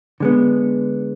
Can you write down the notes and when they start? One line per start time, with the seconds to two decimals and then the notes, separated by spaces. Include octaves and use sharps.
0.20 D3 G#3 B3